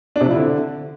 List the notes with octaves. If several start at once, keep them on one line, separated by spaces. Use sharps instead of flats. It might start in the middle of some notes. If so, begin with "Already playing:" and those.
D4
C3
F3
E4
D3